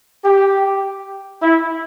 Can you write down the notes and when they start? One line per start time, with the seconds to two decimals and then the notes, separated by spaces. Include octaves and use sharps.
0.24 G4
1.41 E4